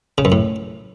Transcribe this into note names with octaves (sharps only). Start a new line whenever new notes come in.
C#3
F#2
A2